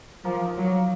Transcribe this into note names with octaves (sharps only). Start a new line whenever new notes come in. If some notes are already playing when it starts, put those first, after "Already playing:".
F3 A#3
D#4
F#3
A#3